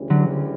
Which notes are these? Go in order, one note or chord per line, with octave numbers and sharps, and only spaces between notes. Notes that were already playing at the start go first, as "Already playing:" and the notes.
Already playing: D2 C#3 E3 G3 C#4
D3 F#3